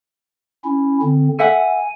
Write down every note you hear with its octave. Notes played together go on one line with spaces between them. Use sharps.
C#4 E4
D3 C4
A4 E5 F#5 G#5